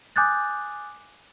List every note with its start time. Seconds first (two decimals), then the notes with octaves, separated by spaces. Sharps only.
0.16 G#5 D6 D#6 F#6 G6 A6